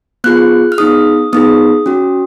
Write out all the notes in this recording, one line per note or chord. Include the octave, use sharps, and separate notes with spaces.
B3 F4 G#4 F#6
F6
B3 D#4 G#4 D#6
B3 D#4 G#4 D#6
C#4 F#4